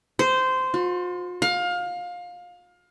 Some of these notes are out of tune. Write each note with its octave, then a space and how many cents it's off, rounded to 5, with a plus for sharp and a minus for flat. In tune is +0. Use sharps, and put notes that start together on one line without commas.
C5 -15
F4 +45
F5 +25